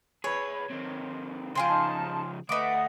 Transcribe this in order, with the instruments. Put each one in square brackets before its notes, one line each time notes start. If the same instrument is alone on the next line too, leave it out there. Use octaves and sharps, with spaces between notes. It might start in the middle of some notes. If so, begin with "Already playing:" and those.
[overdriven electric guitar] G#4 B4 [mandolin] C#5
[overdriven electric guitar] C3 D#3
[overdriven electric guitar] C#3 F3 [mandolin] F4 G#4 C5 [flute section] F5 G5 C6
[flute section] D#4 A5
[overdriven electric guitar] D2 A3 [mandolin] B4 D6 [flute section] D#5 F#5 D#6